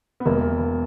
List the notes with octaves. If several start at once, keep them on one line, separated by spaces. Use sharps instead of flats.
B3
E1 A#3